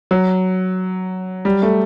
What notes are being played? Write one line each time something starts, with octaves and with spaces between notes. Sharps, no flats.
F#3
G3
A3